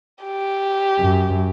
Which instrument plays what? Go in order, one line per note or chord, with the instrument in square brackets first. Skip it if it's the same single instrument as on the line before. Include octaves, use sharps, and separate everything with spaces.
[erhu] G4
[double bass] F#2